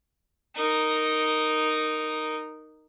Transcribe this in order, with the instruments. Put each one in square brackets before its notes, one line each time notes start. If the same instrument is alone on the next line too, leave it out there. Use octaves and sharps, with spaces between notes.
[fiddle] D#4 A#4